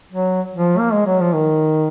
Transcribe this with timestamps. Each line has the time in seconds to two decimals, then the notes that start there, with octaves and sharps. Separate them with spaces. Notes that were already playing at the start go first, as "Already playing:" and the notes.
0.13 F#3
0.53 F3
0.78 A#3
0.93 G#3
1.06 F#3
1.20 F3
1.34 D#3